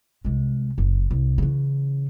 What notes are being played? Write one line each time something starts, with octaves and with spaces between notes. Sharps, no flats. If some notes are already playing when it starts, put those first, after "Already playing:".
C2 G#3
F#1
C2
C#3 E3